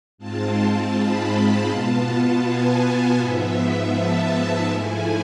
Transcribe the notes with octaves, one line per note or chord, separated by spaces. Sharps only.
G#2 G#3 C4 F4 A5
B5
B2 B3 F4 A5
G#5
G#2 F3 B3 E5
E5
A5
G#2 F3 A3 E4 G#5